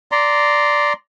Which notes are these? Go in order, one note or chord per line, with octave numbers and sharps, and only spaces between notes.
D5 A#5 C6